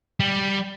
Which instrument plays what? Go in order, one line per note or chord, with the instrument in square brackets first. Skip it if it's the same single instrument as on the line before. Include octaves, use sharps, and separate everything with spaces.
[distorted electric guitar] G3